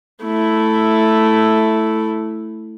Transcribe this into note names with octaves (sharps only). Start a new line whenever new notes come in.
A3 E4